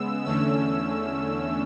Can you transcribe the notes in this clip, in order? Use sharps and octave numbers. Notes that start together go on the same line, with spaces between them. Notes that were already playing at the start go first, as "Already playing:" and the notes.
Already playing: C#3 G#3 B3 E6
E2 D3 A3 C#4 E6